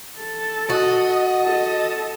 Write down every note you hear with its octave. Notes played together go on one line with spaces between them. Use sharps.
A4
F#4 D#5
A4